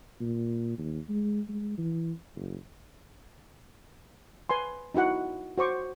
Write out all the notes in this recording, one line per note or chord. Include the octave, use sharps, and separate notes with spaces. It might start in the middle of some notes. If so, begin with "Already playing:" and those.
A#2
D#2
G#3
G#3
E3
F#1
B4 G#5 C6
D#4 E4 F#4 F#5
F#4 C5 C#6 D6